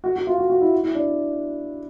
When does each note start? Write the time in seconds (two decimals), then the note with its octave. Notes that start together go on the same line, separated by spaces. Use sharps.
0.04 F#4
0.16 F#4
0.27 F4
0.38 F#4
0.50 F#4
0.61 E4
0.83 E4
0.95 D4